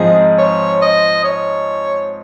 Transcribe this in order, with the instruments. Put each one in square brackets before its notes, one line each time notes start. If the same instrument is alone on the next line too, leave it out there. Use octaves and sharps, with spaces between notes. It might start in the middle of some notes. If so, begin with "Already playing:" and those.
Already playing: [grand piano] G#2 F3 C4 D#4 [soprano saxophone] G#4
[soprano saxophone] C#5
D#5
C#5